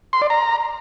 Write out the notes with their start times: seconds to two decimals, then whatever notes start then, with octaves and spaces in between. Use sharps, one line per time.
0.13 C6
0.22 D5
0.30 A#5